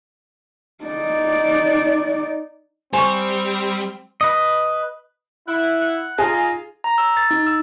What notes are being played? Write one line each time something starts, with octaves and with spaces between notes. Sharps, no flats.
D#4 D5
G3 C4 C5 G#5 C#6
B4 D#5
E4 F#5
F#5
D#4 F4 G#4 A#5
A#5
E6
A6
D#4
E6